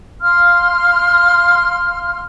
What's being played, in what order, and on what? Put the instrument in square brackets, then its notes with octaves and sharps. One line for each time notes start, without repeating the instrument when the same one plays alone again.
[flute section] F5 C6 F6